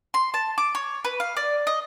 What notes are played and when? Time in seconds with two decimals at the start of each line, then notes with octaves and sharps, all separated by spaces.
0.14 C6
0.34 A5
0.58 D6
0.75 C#5
1.04 B4
1.20 F5
1.37 D5
1.67 D#5